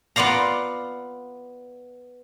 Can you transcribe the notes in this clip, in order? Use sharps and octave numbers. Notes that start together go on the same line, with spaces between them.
B3 F4 D5 F5 A#5